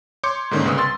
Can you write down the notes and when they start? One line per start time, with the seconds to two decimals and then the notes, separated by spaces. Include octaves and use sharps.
0.23 C#5 C6 D6 G6 C#7
0.51 G#2 D3 D#3 A#3 C#4
0.65 C2 C#3 B4 C#6 D#6 E6
0.78 C6 E6 A6